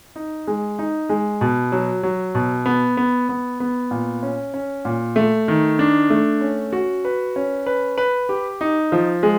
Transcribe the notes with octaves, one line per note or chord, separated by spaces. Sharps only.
D#4
G#3
D#4
G#3
B2
F#3
F#3
B2
B3
B3
B3
B3
A#2
C#4
C#4
A#2
A3
D#3
D4
A3
C#4
F#4
B4
C#4
B4
B4
G4
D#4
F3
G#3